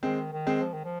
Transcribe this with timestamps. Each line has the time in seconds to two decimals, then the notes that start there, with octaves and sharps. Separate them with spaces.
0.02 D#3 G#3 C4
0.32 D#3
0.47 G#3 C4
0.62 F3
0.73 D#3
0.85 F3